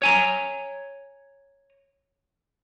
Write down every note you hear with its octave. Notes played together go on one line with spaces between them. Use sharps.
C#5 G#5 A#5